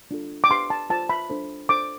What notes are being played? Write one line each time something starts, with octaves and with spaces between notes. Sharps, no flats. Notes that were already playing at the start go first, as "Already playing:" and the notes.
D4 F4 A4
D6
D4 G4 B4 C6
A5
F4 C5 A5
B5
D4 A4 C5
D4 A4 C5 D6